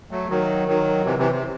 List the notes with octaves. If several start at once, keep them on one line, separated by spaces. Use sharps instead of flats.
F#3 A3
D#3 F#3
D#3 F#3
C3 E3
C3 E3
C3